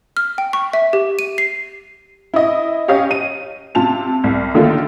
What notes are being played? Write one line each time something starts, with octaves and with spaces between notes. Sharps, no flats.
F6
G5
C#6
E5
G4
D#7
C7
E4 D#5
C#4 G4 C#5 D#5 F5
D#7
C3 F4 A5 F7
C2
D3 D#3 A3 A#3 F4